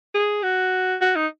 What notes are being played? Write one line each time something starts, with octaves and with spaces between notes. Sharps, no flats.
G#4
F#4
F#4
D#4